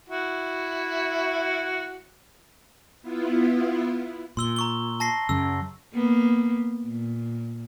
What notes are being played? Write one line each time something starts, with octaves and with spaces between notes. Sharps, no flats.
E4 F#4
B3 E4 F4
A#2 C6 E6 G7
A#5 C#6 G7
A5 A#6 C7
F#2 C#3 E6
A#3 B3
A#2